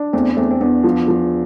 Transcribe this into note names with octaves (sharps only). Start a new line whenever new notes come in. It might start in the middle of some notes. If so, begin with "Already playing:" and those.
Already playing: D4
E2 A3 C4
E2 A3 C4
C4
E2 B3 D4
F3
F3